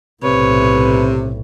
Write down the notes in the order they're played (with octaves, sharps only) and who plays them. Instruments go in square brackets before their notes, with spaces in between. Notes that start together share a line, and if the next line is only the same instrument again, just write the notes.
[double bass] B1 A2 [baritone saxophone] C3 [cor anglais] B4 [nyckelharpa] C#5